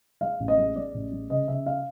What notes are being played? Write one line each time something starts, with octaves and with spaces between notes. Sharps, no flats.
G#3 F5
A1
D#5
G#3
G#3 D5
A1
G#3
C#3 D#5
C#3 E5
F5